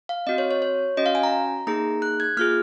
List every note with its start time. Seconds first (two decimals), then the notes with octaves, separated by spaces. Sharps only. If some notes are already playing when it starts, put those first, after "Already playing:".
0.09 F5
0.27 C4 F#4 D#5
0.38 C#5
0.51 C#5
0.62 C#5
0.97 C#4 F#4 D#5
1.06 F5
1.15 G#5
1.23 A#5
1.67 A#3 D#4 G#4 A#5
2.02 F#6
2.20 G#6
2.37 A#3 F4 G#4 F6